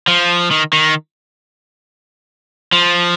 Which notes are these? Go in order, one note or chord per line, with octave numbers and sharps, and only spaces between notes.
F3
D#3
D#3
F3